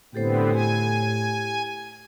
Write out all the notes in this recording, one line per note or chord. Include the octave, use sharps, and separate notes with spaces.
A2 D3 B3 C4 G4 A4 C5
G4 G#5